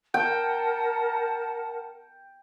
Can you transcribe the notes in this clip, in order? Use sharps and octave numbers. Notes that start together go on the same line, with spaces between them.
A#4 F#5 G5 A5